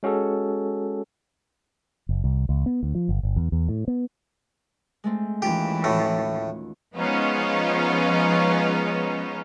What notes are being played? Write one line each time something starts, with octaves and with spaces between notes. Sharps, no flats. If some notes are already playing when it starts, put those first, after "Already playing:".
G#3 C#4 F#4 G#4 A4
F#1
C2
C#2
B3
D2
F3
G1
G1
E2
E2
A2
B3
G#3 A3 C4
D#2 E3 C#4 F4 G4
A2 A3 F4 F#4
F3 G#3 B3 C#4 D#4 F4